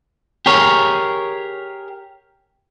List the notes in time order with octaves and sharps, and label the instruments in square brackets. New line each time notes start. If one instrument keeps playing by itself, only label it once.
[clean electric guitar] G4 G#4 A#4 C#5